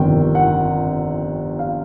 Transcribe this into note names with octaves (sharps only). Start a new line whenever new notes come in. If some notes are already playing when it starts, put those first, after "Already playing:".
Already playing: G1 F2 C3 D#3 G5
F#5
F5